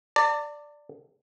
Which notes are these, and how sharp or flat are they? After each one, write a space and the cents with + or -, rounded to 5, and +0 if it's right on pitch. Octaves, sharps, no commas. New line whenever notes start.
D5 +0 A5 +45